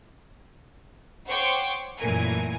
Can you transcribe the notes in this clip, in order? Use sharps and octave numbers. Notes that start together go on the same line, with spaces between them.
C5 C#5 F#5 G5 C#6 D6
F#2 A#2 E3 A3 A#4 G#5